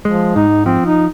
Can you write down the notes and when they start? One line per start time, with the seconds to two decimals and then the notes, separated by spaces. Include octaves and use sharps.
0.05 F3 G#3
0.36 G#2 D#4
0.66 F3 C4
0.86 D#4